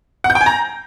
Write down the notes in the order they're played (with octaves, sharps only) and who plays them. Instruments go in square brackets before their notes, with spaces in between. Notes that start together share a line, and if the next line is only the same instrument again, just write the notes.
[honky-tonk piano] F#5
G6
G5
G#5
A#5